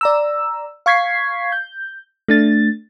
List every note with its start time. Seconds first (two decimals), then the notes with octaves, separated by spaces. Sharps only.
0.01 D5 A#5 E6
0.86 F5 C#6 G#6 B6 C7
1.52 G6
2.28 A3 D4 A6